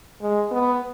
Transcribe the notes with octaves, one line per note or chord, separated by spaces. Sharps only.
G#3
B3